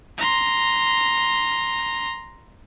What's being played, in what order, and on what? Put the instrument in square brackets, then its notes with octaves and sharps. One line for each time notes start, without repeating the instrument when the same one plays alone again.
[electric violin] A#5 C6